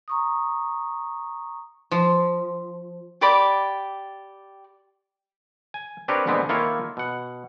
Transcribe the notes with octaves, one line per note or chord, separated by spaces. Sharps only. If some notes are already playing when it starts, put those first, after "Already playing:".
A#5 C#6 D#6
F3
G4 D5 B5 D6
G#5
C4 D4 G4 A#4 B4 C#5
A#2 D3 G#3 B3 C4
D#3 A#3 E4 F4 A4 C#5
B2 F#5